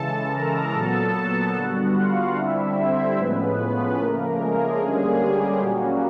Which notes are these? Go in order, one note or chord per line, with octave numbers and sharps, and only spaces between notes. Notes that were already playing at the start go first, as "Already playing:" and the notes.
Already playing: C#3 E3 G#3 A4 A5
A#4 A#5
A#2 F#3 B3 A4 A5
D3 G3 B3 F#4 F#5
F4 F5
D3 G3 C4 E4 E5
C4 C5
A2 F3 G#3 B3 C#4 B4
C#3 F3 A3 A#3 A#4
G#3 G#4
D3 G3 A#3 C#4
G3 G4
A#2 F#3 G3 A#3 C#4 F#4